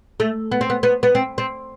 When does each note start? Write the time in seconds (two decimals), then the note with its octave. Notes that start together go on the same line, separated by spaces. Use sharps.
0.20 A3
0.51 B3
0.61 C4
0.70 B3
0.83 B3
1.03 B3
1.15 C4
1.38 C4